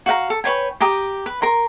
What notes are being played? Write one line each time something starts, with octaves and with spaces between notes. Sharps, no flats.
F#4 F5 F#5 A#5
A4
B4 C#5 G5 G#5
G4 G5 A#5 D#6
B4
A#4 A#5 C6